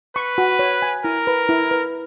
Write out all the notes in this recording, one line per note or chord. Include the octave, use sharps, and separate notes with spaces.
B4 C#6
F#4
C#5
G#5
E4 A#4
B4
E4
B4